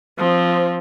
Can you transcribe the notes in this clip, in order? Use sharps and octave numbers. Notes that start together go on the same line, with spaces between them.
F3 C4